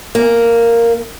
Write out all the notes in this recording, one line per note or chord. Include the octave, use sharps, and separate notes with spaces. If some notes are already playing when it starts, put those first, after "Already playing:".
A#3